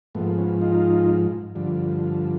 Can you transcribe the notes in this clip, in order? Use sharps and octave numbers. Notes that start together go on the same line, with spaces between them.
G#2 F3 A3 B3
B3 C#4
D#4 F4
G2 D3 F3